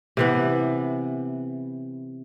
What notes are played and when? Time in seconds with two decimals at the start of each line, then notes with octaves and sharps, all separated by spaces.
0.17 C3 E3 B3